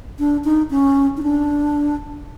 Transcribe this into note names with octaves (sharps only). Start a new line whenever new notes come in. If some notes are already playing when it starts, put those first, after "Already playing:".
D4
D#4
C#4
D#4
D4